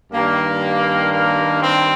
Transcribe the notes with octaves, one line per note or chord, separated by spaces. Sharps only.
G2 D#3 G3 A#3
A#3
C4